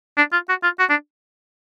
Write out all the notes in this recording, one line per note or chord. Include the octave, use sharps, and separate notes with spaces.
D4
F4
F#4
F4
F#4
D4